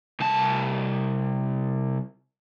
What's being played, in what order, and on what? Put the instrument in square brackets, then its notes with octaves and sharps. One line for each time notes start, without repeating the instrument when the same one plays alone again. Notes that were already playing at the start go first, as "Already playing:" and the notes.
[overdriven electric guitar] C2 A5